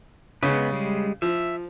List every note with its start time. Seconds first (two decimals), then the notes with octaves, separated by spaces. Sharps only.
0.43 C#3 G#3 B3 B4
0.72 G3 G#3
1.22 F3 E5